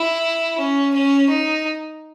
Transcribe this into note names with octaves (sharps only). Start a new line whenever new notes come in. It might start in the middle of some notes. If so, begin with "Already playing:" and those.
Already playing: E4
C#4
C#4
D#4